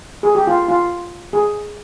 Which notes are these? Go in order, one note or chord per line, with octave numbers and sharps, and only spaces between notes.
G#4
G4
F4
F4
G#4